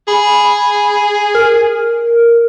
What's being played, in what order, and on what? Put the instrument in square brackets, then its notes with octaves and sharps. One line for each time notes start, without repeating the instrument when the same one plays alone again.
[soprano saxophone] G#4 [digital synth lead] B5
[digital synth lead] A#4